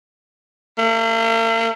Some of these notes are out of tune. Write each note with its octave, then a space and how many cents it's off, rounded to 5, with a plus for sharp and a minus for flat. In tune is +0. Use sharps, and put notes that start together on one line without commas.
A#3 -45